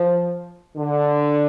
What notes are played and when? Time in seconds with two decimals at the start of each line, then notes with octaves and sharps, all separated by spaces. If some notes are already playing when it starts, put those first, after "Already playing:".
Already playing: F3
0.77 D3